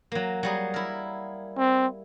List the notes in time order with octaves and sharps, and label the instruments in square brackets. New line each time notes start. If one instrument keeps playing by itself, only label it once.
[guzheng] F#3 A#3
F#3 G3 G#4
E4 A#4
[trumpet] C4